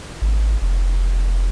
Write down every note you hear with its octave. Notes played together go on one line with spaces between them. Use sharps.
G#1
F1